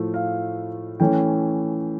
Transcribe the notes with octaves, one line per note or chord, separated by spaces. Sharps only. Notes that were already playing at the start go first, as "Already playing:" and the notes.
Already playing: A2 F3 A3
F5
E3 A3 C#4 G5